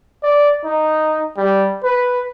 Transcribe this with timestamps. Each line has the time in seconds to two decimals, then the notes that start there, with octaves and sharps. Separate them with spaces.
0.23 D5
0.64 D#4
1.37 G3
1.84 B4